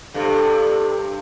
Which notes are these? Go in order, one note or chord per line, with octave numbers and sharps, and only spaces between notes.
G2 C3 A4